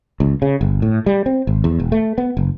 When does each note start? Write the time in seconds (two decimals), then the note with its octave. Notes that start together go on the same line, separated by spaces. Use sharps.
0.20 C#2
0.42 C#3
0.61 G1
0.82 A2
1.06 G3
1.26 C4
1.47 G#1
1.64 E2
1.79 E1
1.92 A3
2.18 B3
2.37 F#1